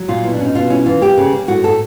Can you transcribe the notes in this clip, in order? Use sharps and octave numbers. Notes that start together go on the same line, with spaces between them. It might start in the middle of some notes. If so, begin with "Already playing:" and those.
Already playing: F#3
A#2 F4
B2 E4
D4
C#4
D#4
B2 F4
C#4 E4
E3 F4
A#3 G4
C#3
A#3
A2 F#4
A2 A4